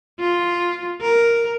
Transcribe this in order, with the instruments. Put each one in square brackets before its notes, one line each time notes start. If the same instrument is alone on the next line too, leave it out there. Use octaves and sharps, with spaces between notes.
[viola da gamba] F4
A#4